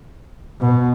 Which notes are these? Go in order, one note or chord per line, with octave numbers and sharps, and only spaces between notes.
B2